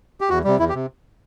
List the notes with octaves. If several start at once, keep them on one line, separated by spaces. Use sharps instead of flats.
G4
E2 F#4
C3 G3
E2 E4
G4
C3